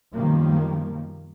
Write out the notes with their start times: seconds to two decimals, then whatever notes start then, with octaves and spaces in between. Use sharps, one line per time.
0.13 F#2 B2 D#3 F3 G3 A#3